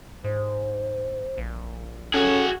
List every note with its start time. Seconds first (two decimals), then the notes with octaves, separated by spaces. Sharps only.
0.24 G#2 C5
1.38 A#1
2.14 C#4 F#4 G#4 A4